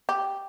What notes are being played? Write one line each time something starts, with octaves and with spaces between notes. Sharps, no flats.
G4